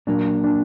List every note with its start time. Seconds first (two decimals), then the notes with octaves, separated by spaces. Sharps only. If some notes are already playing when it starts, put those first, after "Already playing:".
0.07 A#2 F#3 A#3 D4
0.44 D4